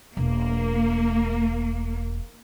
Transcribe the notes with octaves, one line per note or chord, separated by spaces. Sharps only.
E1 A#3